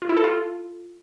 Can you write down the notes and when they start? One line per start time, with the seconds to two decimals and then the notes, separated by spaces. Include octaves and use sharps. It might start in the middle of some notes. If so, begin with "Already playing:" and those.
0.02 F4
0.09 E4
0.17 A4
0.24 F4